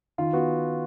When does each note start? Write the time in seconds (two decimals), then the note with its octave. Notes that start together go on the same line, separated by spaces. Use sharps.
0.18 D#3 F4
0.33 B3 F#4